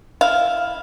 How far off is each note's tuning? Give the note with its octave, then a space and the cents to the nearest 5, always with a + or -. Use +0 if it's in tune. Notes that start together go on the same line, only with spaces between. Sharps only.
E4 +0 F5 +0